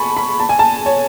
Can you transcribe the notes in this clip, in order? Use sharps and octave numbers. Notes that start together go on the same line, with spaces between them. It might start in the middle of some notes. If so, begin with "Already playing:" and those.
Already playing: G#5 A5 B5 C#6
B5
A5
G#5
A5
C#5